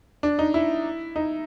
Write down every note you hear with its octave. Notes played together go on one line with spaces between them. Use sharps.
D4
D#4
E4
D#4